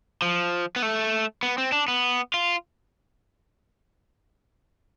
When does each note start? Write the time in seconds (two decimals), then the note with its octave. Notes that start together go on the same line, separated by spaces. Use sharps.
0.22 F3
0.76 B3
0.82 A3
1.43 B3
1.58 C4
1.72 D4
1.88 B3
2.34 F4